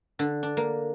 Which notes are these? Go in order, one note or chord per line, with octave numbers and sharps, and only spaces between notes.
D3
D4
A#3